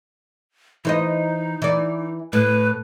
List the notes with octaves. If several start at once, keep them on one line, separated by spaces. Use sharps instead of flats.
E3 D#4 C5 D#5
E3 D5
A2 B4